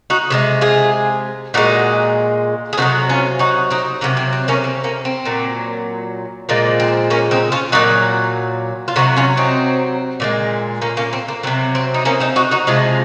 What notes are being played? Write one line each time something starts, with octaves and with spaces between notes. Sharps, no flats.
D#4 F#4
C3 D#3 G#3
F4 G#4
A#2 G#3 D#4 F#4
G#4
C3 D#3 F#3 D#4 F#4
C#4 F4
D#4 F#4
C4 D#4
C3 F#3 A#3 C#4
C4
C4
A#3 C#4
C4
A#3 C#4
C4
A#2 F#3
A#2 F3 G#3 A#3
C4
A#3 C#4
C4 D#4
C#4 F4
A#2 F#3 D#4 F#4
F4
C3 F#3 D#4 F#4
C#4 F4
C4 D#4
A#2 F3 G#3
A#3 C#4
A#3 C#4
C4
A#3
C3 F#3 C4
C4
D#4
A#3 C#4
C4 D#4
D#4 F#4
D#4 F#4
C3 F3 G#3 F4 G#4